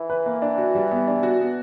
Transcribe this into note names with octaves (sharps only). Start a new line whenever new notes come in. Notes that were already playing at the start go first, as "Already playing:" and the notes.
Already playing: E3
B4
A#3
D4
F#4
G3
B3
D4
F#4
B3